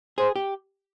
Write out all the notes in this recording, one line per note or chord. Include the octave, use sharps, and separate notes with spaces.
G#4 C5
G4